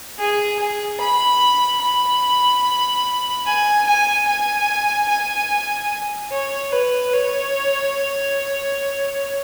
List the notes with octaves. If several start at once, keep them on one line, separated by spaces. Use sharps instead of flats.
G#4
G#4
B5
B5
G#5
G#5
G#5
G#5
C#5
B4
C#5